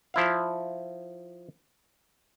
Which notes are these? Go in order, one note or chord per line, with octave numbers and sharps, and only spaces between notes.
F3 E4 F5